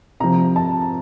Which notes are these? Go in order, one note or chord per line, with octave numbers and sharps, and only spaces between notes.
C3 F3 A#5
A5